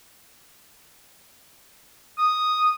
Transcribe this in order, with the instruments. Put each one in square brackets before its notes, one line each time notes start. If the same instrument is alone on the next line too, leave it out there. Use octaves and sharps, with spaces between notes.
[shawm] D#6